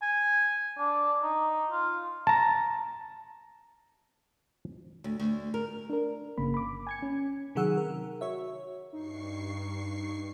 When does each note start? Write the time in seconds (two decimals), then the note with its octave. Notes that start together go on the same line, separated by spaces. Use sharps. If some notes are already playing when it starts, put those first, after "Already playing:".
0.02 G#5
0.78 D4
1.23 D#4
1.71 F4
2.27 A5 A#5
5.04 D2
5.20 D2
5.54 A#4
5.90 D4 A#4
6.38 G1 C#3 A#3 B5
6.54 B5 D6
6.87 G#5 G#6 C#7
7.02 C#4
7.55 C3 D#3 F#3 G#4 F#5 E6
7.77 A#4
8.21 F#4 C#5 E5
8.93 G2 D#4 C#6 C7